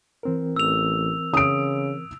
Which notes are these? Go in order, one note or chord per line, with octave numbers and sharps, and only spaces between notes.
E3 C4 A#4
A1 E6 F7
C#3 D#6 D7